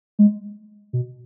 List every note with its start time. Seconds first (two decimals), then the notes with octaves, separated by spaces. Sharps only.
0.19 G#3
0.93 B2